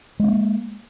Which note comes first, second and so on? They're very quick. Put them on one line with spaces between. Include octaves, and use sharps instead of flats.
G#3 C#4 A#3